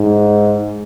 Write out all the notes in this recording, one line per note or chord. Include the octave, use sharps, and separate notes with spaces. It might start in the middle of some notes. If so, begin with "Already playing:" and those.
Already playing: G#2